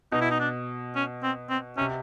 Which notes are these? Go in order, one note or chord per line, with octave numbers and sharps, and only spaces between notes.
B2 D#4
E4
D#4
D4
C#4
C4
C4
C3 C#4